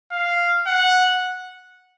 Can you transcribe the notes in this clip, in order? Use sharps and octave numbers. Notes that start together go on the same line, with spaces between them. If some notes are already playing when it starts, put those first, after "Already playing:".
F5
F#5